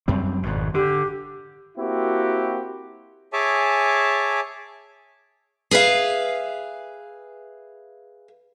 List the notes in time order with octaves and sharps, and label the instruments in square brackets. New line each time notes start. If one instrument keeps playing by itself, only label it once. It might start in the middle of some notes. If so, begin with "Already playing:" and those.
[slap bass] F#2 G3 C4
G#1 F2 B2
[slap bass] D3 [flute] G4
[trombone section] A#3 C4 E4 F#4 G4
[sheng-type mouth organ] G#4 C#5 E5 G#5 A5 D6
[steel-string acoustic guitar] G#4 B4 E5 F5